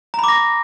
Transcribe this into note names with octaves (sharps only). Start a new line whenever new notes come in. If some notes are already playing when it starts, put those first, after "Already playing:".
A#5 B5 D6 A#6